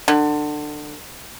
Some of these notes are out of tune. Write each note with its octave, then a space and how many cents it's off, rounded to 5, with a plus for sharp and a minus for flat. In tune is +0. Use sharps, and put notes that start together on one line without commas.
D3 +25